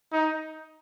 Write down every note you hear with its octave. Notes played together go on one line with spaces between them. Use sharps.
D#4